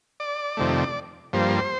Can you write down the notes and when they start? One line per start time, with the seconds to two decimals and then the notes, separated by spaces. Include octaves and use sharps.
0.20 D5
0.57 F2 C3 D#3 A3
1.33 G2 F3 A#3 C5